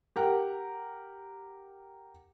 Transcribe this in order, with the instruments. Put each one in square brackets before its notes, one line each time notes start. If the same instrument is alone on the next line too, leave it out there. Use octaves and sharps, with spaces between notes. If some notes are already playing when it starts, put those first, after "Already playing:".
[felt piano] G4 A#4 F#5